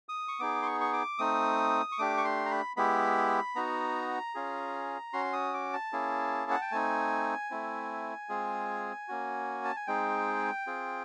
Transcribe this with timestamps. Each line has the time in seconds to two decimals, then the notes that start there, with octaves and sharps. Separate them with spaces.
0.09 D#6
0.28 C#6
0.40 B3 D#4 G#4 D6
0.62 C6
0.66 C#6
0.81 C#6
0.93 D6
1.18 A3 C4 D#4 D#6
1.92 C#6
1.98 A3 D4 G4 D6
2.17 C#6
2.24 C6
2.46 A#5
2.51 B5
2.77 G#3 B3 E4 G4 B5
3.55 B3 D#4 F#4 A#5
4.35 C#4 F4 G#4
5.13 C#4 F#4 C6
5.33 D#6
5.54 D6
5.73 A5
5.93 A#3 C#4 E4 G#4
6.51 F#5
6.61 G5
6.71 A3 C4 D#4 G#5
7.51 A3 C4 E4
8.29 G#3 C4 F4 G#4
9.08 A#3 C#4 F#4
9.65 A5
9.76 G#5
9.87 G#3 C4 D#4 G#4 G5
10.67 C4 F4 G#4